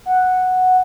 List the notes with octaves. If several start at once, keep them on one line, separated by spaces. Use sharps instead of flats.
F#5